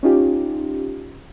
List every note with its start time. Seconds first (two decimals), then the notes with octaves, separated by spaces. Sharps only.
0.03 C#4 D#4 F4 G4